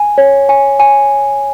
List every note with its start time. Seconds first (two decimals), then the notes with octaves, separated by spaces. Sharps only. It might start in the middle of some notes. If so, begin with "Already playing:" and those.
Already playing: G#5
0.18 C#5
0.49 G#5
0.80 G#5